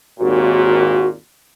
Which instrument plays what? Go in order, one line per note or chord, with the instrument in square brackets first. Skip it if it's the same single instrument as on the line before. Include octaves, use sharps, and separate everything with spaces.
[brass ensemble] G#1 D#2 A#2 [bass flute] F#4